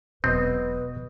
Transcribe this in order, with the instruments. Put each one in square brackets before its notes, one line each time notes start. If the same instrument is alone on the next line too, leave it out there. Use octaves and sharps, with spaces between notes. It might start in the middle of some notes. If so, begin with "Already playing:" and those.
[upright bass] E1 F#3 [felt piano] B2 D#6 [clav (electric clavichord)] C4 [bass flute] B4